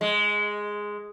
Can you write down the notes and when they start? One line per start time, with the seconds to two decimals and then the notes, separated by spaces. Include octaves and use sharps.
0.01 G#3